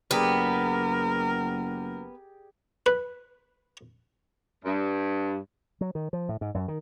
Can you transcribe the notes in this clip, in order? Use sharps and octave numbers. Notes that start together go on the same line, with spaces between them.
F#1 B3 G4 G#4 A#4 D5
B4
G2
F#3
D#3
F3
A2
G#2
F#2
D#3